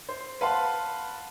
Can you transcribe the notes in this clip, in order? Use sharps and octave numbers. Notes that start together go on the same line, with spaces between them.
C5
B4 F5 F#5 A5 B5 C6